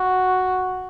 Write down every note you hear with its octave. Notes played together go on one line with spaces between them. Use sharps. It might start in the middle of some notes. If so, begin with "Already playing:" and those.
Already playing: F#4